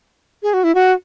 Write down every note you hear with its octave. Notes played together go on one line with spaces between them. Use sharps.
G#4
F#4
E4
F#4